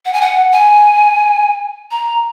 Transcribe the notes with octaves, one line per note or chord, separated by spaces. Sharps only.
F#5
G#5
F#5
G#5
A#5